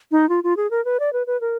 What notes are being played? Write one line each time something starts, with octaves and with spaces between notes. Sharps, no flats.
D#4
F4
F4
G#4
A#4
B4
D5
B4
B4
A#4